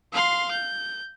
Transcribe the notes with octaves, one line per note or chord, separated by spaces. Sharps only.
F5 C6
G6